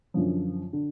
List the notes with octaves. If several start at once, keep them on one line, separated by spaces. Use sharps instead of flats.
F#2 D3 F3
D3